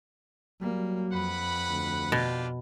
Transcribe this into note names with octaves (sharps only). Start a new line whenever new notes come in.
F#3 G3 A#3
F2 B4 F#5 B5
D2
B2 D4 F4 G4